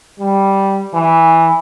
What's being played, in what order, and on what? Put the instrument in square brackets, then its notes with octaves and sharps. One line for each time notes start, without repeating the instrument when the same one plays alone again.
[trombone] G3
E3